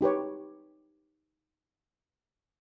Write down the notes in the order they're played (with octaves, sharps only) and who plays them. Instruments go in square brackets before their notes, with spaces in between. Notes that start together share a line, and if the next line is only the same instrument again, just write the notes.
[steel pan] D#4 G4 B4 C#5